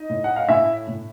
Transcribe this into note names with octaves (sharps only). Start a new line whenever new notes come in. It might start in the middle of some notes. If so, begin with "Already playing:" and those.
Already playing: D#4 D#5
A2
F#5
F5
A2 E4 E5
A2